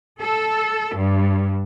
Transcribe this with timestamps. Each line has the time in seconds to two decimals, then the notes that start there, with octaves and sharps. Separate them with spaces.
0.20 A4
0.97 G2